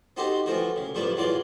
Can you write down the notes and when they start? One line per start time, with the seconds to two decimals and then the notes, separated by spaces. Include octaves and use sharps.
0.17 C4 D#4 F#4 G4 A4 C5
0.46 E3 F3 A3 C4 F#4
0.76 C#3
0.95 A1 G2 F3 D4 A4 B4
1.16 E2 E3 F#3 F4 D5 C6